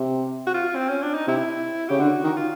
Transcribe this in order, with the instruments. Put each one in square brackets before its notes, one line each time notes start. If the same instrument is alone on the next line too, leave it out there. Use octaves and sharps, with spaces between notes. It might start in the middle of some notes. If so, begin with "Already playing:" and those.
Already playing: [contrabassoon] C3
[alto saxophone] F#4
F4
C4
C#4
D4
D#4
[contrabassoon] C3 [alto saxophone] E4
[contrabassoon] C#3 [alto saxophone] G4
[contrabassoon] D3 [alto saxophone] F#4
[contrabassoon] D#3
[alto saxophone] F4